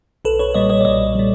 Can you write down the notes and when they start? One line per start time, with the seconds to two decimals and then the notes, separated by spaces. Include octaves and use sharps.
0.25 B1 A4 B4
0.39 B4 C#5
0.54 A#2 G3 C#5 D#5
0.70 C#5 D#5
0.81 D5
0.85 B1 C#5 D#5
1.15 A#2 G3